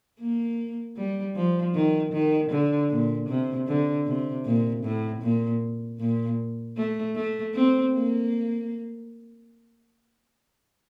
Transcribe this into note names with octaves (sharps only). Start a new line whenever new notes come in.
A#3
G3
F3
D#3
D#3
D3
A#2
C3
D3
C3
A#2
A2
A#2
A#2
A3
A3
C4
A#3